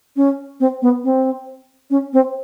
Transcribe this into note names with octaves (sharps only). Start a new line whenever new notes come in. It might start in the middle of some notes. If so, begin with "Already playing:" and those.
C#4
C4
B3
C4
C#4
C4